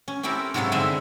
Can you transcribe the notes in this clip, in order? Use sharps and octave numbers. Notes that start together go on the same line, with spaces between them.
C#4
C4 C#4 E4 G4 A4 A#4
G#2 C3 F#3 E4 A4 F5
G2 D3 G#3 C4 E5 C6